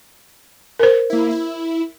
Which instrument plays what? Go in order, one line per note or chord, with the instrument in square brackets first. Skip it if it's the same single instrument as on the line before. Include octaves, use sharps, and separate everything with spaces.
[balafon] A#4 C5
[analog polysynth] A#3 E4
E4